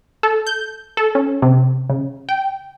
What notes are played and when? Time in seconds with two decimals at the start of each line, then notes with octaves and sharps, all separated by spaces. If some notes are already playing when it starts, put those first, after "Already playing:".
0.23 A4
0.47 G6
0.97 A4
1.15 C#4
1.42 C3
1.90 C#3
2.29 G5